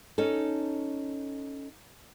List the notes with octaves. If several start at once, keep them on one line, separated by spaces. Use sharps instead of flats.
C#4 D#4 A4